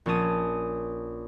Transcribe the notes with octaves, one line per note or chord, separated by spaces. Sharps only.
A#1 C#4 C#5 A5 D#6 D#7